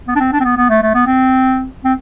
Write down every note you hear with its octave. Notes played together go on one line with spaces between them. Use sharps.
B3
D4
C4
D4
C4
B3
B3
A3
A3
B3
C4
C4